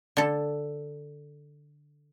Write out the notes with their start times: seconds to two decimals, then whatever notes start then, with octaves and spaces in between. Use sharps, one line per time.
0.17 D3 A4